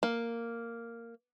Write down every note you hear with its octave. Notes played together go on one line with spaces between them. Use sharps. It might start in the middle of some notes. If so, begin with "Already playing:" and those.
A#3